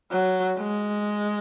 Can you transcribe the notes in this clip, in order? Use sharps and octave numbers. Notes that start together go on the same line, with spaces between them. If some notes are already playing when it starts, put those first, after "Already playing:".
F#3
G#3